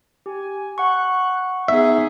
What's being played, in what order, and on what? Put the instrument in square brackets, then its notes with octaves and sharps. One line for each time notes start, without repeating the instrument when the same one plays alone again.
[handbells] G4 [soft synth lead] G#5
[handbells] F#5 C#6 [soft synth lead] F#6
[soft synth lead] B3 [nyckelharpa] D#4 G#4 [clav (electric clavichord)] E5